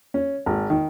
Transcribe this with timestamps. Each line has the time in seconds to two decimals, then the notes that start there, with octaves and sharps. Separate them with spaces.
0.14 C#4
0.46 G#1
0.70 D#3